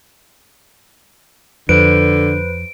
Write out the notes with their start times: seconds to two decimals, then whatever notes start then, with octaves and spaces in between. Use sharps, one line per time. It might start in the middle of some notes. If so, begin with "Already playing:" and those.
1.69 F2 D3 B4 C5 D7